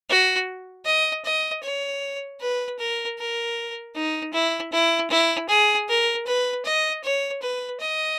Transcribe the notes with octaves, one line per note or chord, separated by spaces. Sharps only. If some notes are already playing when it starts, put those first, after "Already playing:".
F#4
D#5
D#5
C#5
B4
A#4
A#4
D#4
E4
E4
E4
G#4
A#4
B4
D#5
C#5
B4
D#5